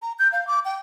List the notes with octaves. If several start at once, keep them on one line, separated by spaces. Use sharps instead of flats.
A#5
G6
F5
D6
G5